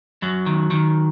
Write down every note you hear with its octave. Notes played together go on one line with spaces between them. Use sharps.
F#2 F#3
D#3
D#3